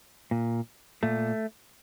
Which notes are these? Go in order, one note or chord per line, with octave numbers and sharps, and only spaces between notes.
A#2
A#2 A3